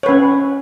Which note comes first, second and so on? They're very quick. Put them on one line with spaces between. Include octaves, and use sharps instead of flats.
C#5 B4 C#4